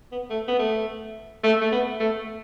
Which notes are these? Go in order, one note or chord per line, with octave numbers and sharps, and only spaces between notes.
B3
A3
B3
A3
A3
A3
B3
A3